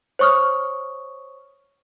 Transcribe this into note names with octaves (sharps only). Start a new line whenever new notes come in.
C5 C#5 C#6 D#6 F6